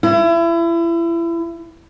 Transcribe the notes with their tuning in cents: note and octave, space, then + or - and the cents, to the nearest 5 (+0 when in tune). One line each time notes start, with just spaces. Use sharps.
E4 +30